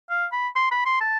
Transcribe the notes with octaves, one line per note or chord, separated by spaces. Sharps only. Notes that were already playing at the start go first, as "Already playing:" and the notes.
F5
B5
C6
B5
C6
A5